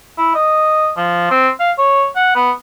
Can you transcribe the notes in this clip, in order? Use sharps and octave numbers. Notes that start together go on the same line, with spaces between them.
E4
D#5
F3
C4
F5
C#5
F#5
B3